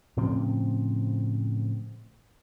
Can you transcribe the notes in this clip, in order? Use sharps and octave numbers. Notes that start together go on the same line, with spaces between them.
A2 C#3 F3 C4